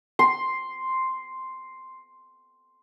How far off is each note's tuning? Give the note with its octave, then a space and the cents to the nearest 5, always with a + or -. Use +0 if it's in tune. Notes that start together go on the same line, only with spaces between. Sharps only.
C6 +0